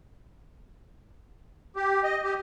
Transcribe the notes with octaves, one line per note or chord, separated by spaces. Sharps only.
G4
D#5
G4